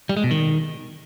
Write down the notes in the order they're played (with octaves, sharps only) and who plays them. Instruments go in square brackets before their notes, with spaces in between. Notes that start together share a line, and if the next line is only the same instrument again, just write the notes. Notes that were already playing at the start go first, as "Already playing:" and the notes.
[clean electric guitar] G3
G#3
B2
D#3